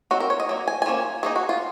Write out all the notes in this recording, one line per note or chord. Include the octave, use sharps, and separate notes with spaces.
D#3 F#3 C4 F#4
A#4
C#5
D#5
F#3 A#3
G#5
G#5
F3 A#3 C#4
D#3 A#3 D#4 G#4
F#4
F4